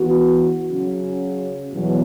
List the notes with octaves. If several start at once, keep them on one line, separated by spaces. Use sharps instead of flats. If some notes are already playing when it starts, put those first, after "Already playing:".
Already playing: E2 E3 B3 F#4
C#3 F#3 C#4
E2 B2 F#3